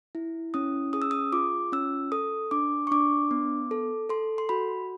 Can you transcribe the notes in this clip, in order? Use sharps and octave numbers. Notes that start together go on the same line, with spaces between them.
E4
C#4 D#6
G#4 D#6
E6
D#6
F4 D6
C#4 E6
A4 D#6
D4 D6
C#6
D4 D6
B3
A4
A4 C6
C6
F#4 B5